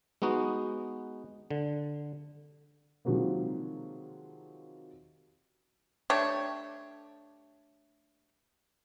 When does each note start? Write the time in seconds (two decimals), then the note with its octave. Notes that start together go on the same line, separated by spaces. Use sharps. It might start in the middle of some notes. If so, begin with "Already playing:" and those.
0.22 G#3 B3 D#4 F#4
1.50 D3
3.05 C3 D#3 F3 F#3 G#3 A#3
6.10 A3 D4 G4 C#5